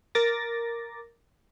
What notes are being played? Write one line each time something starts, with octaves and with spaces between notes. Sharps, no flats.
A#4 D6 A6 A#6